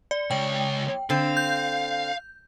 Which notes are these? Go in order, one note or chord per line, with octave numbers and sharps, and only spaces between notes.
D5
C#2 C#5 G5
D3 C4 F5
G6